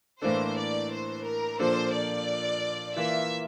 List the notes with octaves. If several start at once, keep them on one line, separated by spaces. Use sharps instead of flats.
A2 E3 A#3 D4 A4 C5
D5
C5
A#4
A#2 F3 A#3 D4 A4 C5
D5
E3 A#3 F4 E5